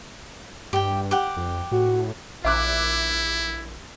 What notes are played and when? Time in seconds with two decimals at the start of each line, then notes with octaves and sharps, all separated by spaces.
0.73 G2 G4 G5
1.11 G4 F#5
1.37 F2
1.72 A2 F#4
2.45 A#1 E4 E5 D6 F#6